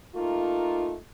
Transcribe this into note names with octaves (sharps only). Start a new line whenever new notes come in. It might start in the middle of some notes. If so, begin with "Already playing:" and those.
A3 A#3 D#4 F4